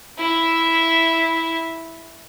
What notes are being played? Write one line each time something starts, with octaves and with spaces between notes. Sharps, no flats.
E4 E5